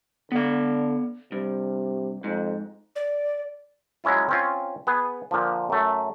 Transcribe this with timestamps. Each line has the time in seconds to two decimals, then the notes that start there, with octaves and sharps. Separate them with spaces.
0.32 D3 B3 F5
1.32 G2 C3
2.24 F2 G#2
2.96 D5
4.04 F#3 G#3 C#4 E4 F4
4.29 C4 C#4 F4
4.87 B3 G#4 B4
5.31 A#2 D3 F3
5.70 F#2 A3